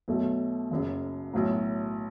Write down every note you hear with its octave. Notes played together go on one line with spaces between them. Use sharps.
B1 B2 A3
F#1 F#2 C#3
B1 A2 F#3